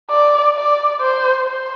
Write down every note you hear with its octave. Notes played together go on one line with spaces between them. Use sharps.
D5
D5
C5
C5